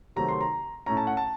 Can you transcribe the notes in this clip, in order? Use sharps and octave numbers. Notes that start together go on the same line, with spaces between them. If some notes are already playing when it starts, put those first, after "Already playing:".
C3 D#3 F#3 A3 C4 A#5
C6
A#5
A2 A3 C#4 A#5
A5
F#5
A5